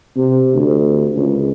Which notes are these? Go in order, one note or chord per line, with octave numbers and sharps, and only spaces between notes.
C3
D2
C#2